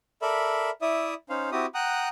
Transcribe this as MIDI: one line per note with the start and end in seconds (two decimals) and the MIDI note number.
0.22 0.70 69
0.22 0.70 70
0.22 0.70 74
0.22 0.70 76
0.22 0.70 83
0.82 1.14 64
0.82 1.14 74
0.82 1.14 76
0.82 1.14 87
1.29 1.50 61
1.29 1.50 63
1.29 1.50 72
1.29 1.50 77
1.52 1.66 60
1.52 1.66 64
1.52 1.66 66
1.52 1.66 67
1.52 1.66 87
1.74 2.09 78
1.74 2.09 79
1.74 2.09 82
1.74 2.09 87
1.74 2.09 90